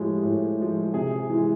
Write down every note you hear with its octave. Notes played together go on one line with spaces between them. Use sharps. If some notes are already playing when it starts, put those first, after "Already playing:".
Already playing: A2 F3 G#3 G4
A2
F3 G#3
C3 G#4
E3 G#3